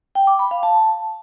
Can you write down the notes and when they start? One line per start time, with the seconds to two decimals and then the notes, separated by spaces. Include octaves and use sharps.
0.15 G5
0.27 D6
0.39 B5
0.51 F5
0.63 A5